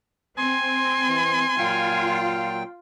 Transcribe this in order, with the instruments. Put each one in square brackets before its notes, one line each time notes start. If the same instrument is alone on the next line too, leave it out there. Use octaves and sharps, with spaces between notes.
[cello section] C4 [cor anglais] G#5 [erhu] C6
[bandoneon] E3
[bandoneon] A#2 F#3 G5 [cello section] F4